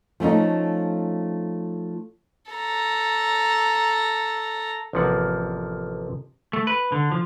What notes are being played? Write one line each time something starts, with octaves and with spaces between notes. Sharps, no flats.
F3 A3 C#4 D#4
A4 A#5
A1 C3 F3 A#3 F#5
A3
B4
D3
F3